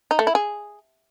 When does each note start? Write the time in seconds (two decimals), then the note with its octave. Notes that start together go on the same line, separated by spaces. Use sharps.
0.11 D#4
0.19 A3
0.27 E4
0.35 G#4